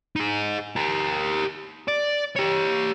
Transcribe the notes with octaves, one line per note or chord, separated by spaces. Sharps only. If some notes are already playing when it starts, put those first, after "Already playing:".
D#4 G#4
G4 A#4
D5
G4 C#5